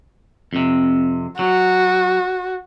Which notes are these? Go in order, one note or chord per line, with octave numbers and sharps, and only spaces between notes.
F2 C3
F#3 F#4